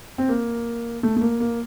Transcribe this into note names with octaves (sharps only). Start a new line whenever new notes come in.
C4
A#3
A3
A3
A#3
A#3